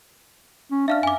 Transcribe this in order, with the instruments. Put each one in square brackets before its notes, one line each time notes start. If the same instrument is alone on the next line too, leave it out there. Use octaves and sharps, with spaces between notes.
[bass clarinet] C#4
[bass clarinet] D4 [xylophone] E5 F5 F6
[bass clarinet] F#2 [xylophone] G#5 D6